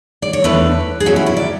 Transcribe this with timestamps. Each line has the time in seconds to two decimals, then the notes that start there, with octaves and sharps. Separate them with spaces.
0.22 D5
0.33 C#5
0.44 E2 D3 A3 D4 B4
1.00 G#4
1.06 B2 F#3 C#4 F#4
1.16 E4
1.26 E4
1.37 D5